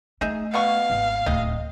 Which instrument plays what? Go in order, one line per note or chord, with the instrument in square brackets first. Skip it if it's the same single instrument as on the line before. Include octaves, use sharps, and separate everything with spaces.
[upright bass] A3 [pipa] D#4 G#4 E5
[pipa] B2 B3 C#6 [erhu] F5
[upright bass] G#1
[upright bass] D1 D#2 [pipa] C3 D#5